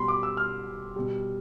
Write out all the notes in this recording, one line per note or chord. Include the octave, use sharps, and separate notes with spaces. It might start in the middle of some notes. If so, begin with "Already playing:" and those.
Already playing: B2 G3 B5 C6
D6
E6
F6
B2 G3